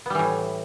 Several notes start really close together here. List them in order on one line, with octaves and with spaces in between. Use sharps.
B3 G3 E3 A2